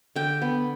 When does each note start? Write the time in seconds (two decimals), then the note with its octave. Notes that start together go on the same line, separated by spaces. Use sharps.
0.16 D3 G5
0.42 B3